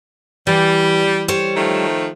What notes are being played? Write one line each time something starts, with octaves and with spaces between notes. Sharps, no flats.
E3 G3
G3 C5 C#5
D#3 F3 A3